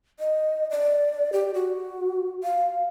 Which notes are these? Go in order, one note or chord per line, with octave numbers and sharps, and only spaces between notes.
D#5
D5
G4
F#4
F5